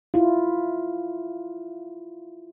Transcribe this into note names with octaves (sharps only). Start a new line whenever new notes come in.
E4 F4